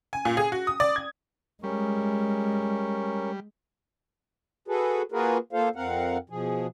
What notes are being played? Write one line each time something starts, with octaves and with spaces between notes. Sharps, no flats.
G#5
A#2
G#4
F#4
D#6
D5
G#6
G3 G#3 C#4 A#4 C#6
F#4 G#4 A4 B4
A#3 F4 F#4 G#4 A#4 B4
A#3 F4 A4 C5 F5
F2 C4 A#4 F5 F#5
B2 F3 G#4